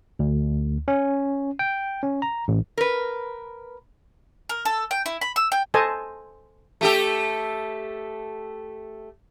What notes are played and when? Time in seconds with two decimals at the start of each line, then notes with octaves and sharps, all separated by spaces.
0.19 D2
0.88 C#4
1.59 G5
2.03 C#4
2.22 A#5
2.48 A1
2.77 A#4 B4
4.49 A#4
4.65 A4
4.91 G5
5.06 E4
5.21 B5
5.36 E6
5.52 G5
5.74 A4 C5 D#5 G#5 A5
6.81 A3 G4 A4